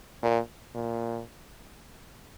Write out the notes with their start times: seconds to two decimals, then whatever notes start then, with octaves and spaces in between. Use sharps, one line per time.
0.23 A#2
0.75 A#2